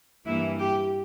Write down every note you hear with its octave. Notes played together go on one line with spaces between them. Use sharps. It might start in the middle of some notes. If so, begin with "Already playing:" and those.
G2 E3 A#3 E4
G4